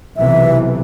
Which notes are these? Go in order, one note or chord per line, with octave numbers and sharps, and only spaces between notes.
B1 C3 E3 E5